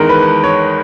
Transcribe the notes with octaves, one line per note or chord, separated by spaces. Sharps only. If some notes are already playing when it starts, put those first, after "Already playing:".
Already playing: E2 D#3 G#3 A#4
B4
C#5